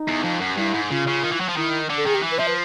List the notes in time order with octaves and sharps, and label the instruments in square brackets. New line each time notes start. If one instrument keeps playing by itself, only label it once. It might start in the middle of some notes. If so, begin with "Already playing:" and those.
Already playing: [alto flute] D#4
[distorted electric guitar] E2
F2
F#2
[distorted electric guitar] G2 [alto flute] E4
[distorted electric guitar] G#2
[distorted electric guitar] C#3 [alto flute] F4
[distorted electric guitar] C#3
D#3
E3
F#3
F3
[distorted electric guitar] D#3 [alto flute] E4
[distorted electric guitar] D3
[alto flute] A4
[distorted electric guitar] D#3 [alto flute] G#4
[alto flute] G4
[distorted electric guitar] E3
[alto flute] B4
[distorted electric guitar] F3 [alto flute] E5
[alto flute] B4